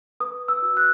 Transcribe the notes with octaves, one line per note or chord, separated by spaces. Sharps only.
B4 D#6
E6
F#4
F#6